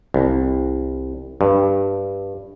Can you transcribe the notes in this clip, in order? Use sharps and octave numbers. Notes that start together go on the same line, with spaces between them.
C2
G2